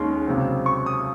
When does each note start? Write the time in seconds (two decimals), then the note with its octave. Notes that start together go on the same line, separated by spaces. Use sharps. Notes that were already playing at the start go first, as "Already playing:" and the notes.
Already playing: D#2 D#3 G#3 C#4 C6
0.27 C#2 C3 F#3 C4
0.66 C#6
0.86 D#6